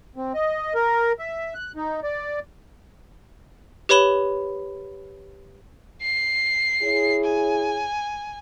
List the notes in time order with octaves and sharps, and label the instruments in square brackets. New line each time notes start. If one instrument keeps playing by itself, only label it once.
[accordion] C4
D#5
A#4
E5
F#6
D#4
D5
[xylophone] G4 B4 C#5 B5 E7 G7
[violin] C7
[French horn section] E4 G#4 C#5
[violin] G#5